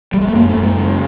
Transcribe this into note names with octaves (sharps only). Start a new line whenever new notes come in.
G3
G#3
A3
F#2 A#3
A3
F#2
G#3
C#3